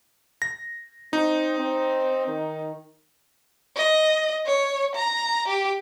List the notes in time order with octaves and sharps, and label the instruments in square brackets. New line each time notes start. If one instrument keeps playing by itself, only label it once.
[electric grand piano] A#6
[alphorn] C4 [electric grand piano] D#4
[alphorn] C4
D#3
[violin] D#5
C#5
A#5
G4